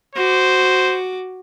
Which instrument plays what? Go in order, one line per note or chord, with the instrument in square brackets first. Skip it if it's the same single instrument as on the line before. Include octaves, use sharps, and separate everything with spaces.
[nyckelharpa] F#4 D6 [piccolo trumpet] C5